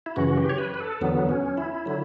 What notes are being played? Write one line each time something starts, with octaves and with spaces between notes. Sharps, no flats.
E4
F#2 C#3 E3 F#4
G4
C#5
B4
B4
A4
E2 D3 F#3 B3
C#4
E4
D3 F#3